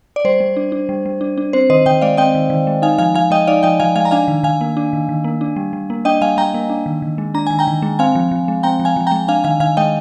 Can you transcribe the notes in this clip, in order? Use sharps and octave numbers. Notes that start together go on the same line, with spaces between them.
D5
G3 C5
G3
D4
D4
G3
G3
D4
D4
C4 C5
D#3 C5 D#5
D#3 D#5 G5
G#3 D5 F5
C4 D#5 G5
D#3
D#3
G#3
D#4 F5 G#5
F3 F5 G#5
F3 F5 G#5
G#3 D#5 G5
D#4 D5 F5
F3 D#5 G5
F3 F5 G#5
G#3 F5 G#5
A#5
D4 F5 G#5
D#3
D#3 F5 G#5
A#3
D4
D#3
D#3
A#3
D4
G3
G3
A#3
D4 D#5 G5
G3 F5 G#5
G3 G5 A#5
A#3
D4
D#3
D#3
G#3
D4 A#5
D#3 G#5
G5 A#5
D#3
G#3
C4 F5 G#5
F3
F3
G#3
C4 G5 A#5
F3
F5 G#5
F3
G#3 G5 A#5
D4 F5 G#5
D#3 F5 G#5
D#3 F5 G#5
G#3 D#5 G5